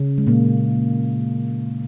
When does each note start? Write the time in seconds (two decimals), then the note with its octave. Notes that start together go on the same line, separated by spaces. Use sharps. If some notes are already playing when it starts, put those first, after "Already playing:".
Already playing: C#3 C#4
0.18 G#3
0.27 A#2 A#3